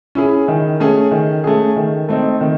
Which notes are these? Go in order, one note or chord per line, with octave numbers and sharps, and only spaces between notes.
C#4 E4 G#4
D#3
A3 C#4 G#4
D#3
A3 C#4 G#4
D#3
A3 C4 D#4
D#3